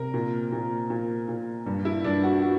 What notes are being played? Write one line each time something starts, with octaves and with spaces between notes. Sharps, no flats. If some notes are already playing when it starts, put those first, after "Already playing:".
Already playing: C3 A#4
A#2
A#2
A#2
A#2
G2
E4
G2 D4
F#4
F#4